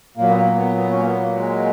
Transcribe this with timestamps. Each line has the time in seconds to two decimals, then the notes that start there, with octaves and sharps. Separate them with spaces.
0.17 A#2 F#3 A#3
0.29 B3
0.37 A#3
0.56 B3
0.76 B3
0.90 C#4
0.99 A#3
1.06 B3
1.21 A#3
1.36 G#3